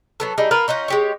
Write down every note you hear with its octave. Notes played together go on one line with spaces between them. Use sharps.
F#3 B3 A4
G3 D#4 E4 G#4
F4 A#4 B4
C#4 D#4 F4 F#5
G#3 G4 C#5